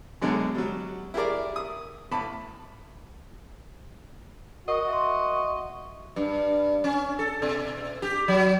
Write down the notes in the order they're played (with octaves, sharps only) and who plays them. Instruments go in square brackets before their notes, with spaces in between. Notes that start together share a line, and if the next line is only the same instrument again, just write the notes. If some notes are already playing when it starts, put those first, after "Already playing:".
[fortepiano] F#2 B2 D3 F#3 G#3
F#3 G3
E4 G4 G#4 A#4 D5
D#6
A1 A5 B5
[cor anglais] F#4 [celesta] A#4 F#5 [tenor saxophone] D#5
[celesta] E5 C6
[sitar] G2
C#4
A4
B2
G4
F#3